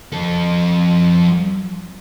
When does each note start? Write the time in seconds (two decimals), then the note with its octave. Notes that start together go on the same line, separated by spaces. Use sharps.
0.13 F3 A4